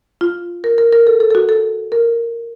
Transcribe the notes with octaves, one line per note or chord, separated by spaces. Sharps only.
F4
A#4
A#4
A#4
A4
A4
A4
F#4
A4
A#4